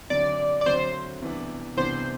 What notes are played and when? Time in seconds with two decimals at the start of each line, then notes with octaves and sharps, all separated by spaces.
0.10 D2 D3 F#3 C4 D5
0.61 D5
0.66 D2 D3 F#3 C4 C5
1.22 C2 C3 E3 B3 D4
1.76 C2 C3 E3 B3 D4 C5